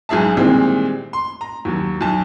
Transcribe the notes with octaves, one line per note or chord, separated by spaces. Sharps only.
B1 G#2 G#4 E5 A5
A#2 D#3 E3 G3 G#3 C4
C6
A#5
D#2 F#3
B1 A5